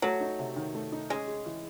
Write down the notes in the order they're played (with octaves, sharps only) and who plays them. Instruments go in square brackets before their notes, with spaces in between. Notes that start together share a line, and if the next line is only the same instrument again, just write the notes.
[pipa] F#3 [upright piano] A3
[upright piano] D#4
C3
D#3
A3
D#4
[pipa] G#3 [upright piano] C#4
[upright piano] G#4
E3